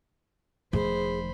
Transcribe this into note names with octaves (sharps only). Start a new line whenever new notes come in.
E1 D#3 F3 A3 G#4 C5 B5